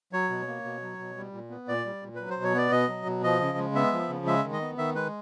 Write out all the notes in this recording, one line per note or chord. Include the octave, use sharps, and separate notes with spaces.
F#3 C#5
B2
A#3
B2
F#3
B2
G3
A#2
B3
A#2 D5
G3
A#2
F#3 B4
C5
B2
C#5
B3 D5
B2 D#5
F#3
B2
F3 D#5
C#3
G#3
B3 E5
F3
C#3
G#3 E5
D#3
D#5
B3
D#3 E5
G#3 B4